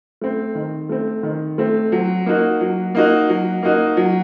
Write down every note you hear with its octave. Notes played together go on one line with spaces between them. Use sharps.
A3 C4
D#3
A3 C4
D#3
A3 C4
F#3
A#3 D#4 F#4
F#3
A#3 D#4 F#4
F#3
A#3 D#4 F#4
F#3